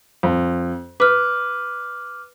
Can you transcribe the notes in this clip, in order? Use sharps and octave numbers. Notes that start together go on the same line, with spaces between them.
F2
B4 D6 F6